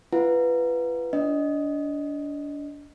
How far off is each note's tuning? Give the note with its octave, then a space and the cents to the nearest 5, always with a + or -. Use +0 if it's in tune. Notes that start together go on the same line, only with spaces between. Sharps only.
F4 -40 B4 +0 F#5 -25
D4 -25 D#5 +0